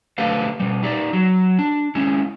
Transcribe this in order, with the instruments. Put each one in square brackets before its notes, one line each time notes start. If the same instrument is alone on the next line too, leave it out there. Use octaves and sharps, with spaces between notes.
[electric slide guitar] D3 A3 G4 A4 B4 F5
B2 G3
D#4 G4 D5
F#3
D4
G#3 C#4 E4